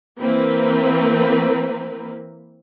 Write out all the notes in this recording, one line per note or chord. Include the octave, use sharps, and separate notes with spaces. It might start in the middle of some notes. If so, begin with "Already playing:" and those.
E3 A#3 C4 A#4 B4